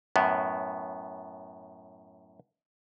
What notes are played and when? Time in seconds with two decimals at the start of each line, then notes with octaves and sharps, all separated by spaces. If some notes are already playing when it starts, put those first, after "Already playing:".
0.16 F#2 A2 B3